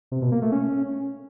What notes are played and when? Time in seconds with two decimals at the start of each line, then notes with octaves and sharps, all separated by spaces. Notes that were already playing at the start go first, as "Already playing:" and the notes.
0.12 C3
0.22 B2
0.32 A#3
0.42 A3
0.52 C#4